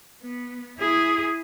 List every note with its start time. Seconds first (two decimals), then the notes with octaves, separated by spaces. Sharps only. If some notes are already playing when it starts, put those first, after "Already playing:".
0.23 B3
0.78 E4 G#4